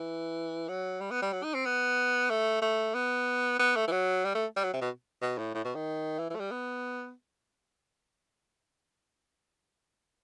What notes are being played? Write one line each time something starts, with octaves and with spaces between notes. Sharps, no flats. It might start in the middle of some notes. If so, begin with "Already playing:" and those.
Already playing: E3
F#3
G3
B3
G3
F#3
D#4
C4
B3
A3
A3
B3
B3
A3
E3
F#3
G3
A3
G3
F#3
C3
B2
B2
A2
A2
B2
D#3
E3
E3
A3
G3
B3